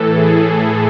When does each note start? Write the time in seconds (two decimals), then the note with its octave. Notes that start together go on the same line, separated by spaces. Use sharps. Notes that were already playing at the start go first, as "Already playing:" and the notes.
Already playing: A2 E3 A4
0.12 G#4